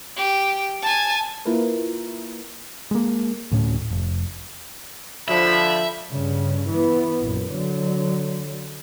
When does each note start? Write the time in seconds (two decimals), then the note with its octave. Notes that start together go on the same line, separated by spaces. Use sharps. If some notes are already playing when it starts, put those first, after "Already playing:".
0.16 G4
0.82 G#5 A5
1.45 A#3 E4 F4 A#4 B4
2.91 G#3 A#3
3.52 D2 A2 C#4
3.91 F1
5.28 D3 F3 E5 B5
6.11 G2 C#3
6.69 E3 B3
7.21 A#1 F#2
7.51 D3 F#3